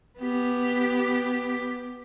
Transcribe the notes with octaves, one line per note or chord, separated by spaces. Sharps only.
B3 G4